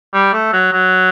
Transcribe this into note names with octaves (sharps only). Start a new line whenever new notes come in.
G3
A3
F#3
F#3